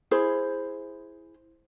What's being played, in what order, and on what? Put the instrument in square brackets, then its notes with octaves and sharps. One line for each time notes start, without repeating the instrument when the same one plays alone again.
[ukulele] E4 G#4 C5